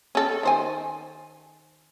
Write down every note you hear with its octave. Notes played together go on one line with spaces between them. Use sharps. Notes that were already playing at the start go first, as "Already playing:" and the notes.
C#4 A4
D#3 C5 G#5